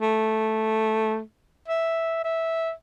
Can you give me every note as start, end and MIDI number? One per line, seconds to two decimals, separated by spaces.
0.01 1.20 57
1.68 2.21 76
2.24 2.71 76